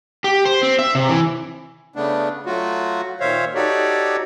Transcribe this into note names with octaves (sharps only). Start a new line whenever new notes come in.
G4
C5
C4
E5
C3
E3
C#3 A3 B3 D4
F#3 A3 F4 F#4
A#2 D#3 C5 C#5 E5 F5
D#4 F#4 G4 A4 C#5 D5